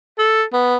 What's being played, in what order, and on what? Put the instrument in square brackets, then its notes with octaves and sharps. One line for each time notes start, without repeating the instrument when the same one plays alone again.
[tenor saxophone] A4
B3